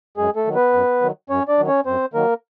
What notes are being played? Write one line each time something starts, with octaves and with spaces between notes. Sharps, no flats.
F#2 G#3 G#4
A3 A4
D#3 F#3
B3 B4
F#2
D#3 F#3
F#2 C#4 C#5
D4 D5
D#3 F#3
C#4 C#5
F#2 C4 C5
D#3 F#3 A#3 A#4